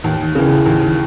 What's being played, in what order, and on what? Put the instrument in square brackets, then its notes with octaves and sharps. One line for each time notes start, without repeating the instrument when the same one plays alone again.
[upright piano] D#2
C#3 E3
D#2